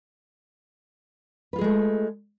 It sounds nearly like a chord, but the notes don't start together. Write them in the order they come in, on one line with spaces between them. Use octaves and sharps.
B4 F4 G#4 G#3 A3